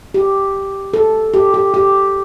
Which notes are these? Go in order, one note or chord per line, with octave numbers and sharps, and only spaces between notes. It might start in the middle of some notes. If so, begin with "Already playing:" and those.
G4
A4
G4
G4
G4